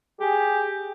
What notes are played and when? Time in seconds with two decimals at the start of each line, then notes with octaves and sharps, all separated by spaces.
0.21 G4 G#4